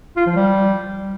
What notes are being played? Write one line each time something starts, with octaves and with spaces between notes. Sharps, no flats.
F4
F3
G3